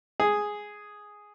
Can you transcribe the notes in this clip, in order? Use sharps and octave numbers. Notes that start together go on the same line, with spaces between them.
G#4